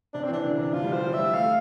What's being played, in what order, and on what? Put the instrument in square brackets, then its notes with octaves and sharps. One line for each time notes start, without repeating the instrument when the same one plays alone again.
[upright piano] C3 [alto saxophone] D4
[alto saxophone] C4
[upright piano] E3
[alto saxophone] D4
[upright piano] D3
C3
[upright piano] D3 [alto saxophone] F4
[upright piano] G3
F3
[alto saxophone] C5
[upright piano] F3
[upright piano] G3 [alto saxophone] E5
[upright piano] A3 [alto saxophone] F5